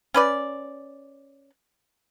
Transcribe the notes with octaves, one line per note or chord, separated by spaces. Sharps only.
C#4 B4 D5